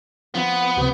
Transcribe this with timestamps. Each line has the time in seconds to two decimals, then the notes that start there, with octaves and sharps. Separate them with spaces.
0.35 F3 B3
0.77 C#2 C3 G4